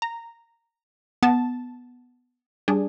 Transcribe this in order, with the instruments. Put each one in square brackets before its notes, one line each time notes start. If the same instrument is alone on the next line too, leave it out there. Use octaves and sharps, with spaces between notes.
[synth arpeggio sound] A#5
[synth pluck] B3 [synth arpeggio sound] A5
[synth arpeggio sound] G3 D4 G#4